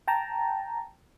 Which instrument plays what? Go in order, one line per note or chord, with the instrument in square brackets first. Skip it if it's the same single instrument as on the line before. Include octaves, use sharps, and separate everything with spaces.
[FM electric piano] G5 A5 A#5